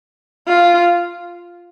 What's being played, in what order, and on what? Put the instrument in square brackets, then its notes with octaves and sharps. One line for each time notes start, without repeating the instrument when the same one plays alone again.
[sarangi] F4